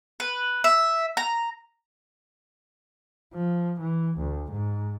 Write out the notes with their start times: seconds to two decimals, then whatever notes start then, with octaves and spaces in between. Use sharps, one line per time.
0.20 B4
0.64 E5
1.17 A#5
3.34 F3
3.80 E3
4.18 D2
4.51 G#2